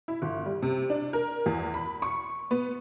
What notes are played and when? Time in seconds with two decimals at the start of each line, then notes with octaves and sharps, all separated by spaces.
0.08 E4
0.22 G1
0.46 G3
0.62 C3
0.90 D4
1.13 A#4
1.46 E2
1.74 B5
2.02 C#6
2.51 B3